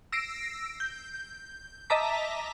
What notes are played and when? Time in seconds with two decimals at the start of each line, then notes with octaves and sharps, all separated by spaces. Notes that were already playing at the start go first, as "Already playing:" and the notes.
0.12 E6 A#6 C7 D7
0.80 G6
1.90 D#5 E5 A5 A#5 D6 B6